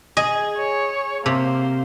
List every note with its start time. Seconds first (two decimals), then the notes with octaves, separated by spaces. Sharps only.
0.17 G#4 D#5
0.57 C#5
1.26 C3 A#3 C5